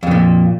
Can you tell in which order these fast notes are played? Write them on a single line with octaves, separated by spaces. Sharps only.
F2 C#3 A#2